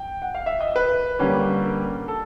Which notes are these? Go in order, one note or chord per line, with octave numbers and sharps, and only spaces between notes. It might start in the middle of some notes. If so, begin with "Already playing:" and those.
Already playing: G5
F#5
F5
E5
D#5
B4
D3 G3 A#3 C#4
A#4
A4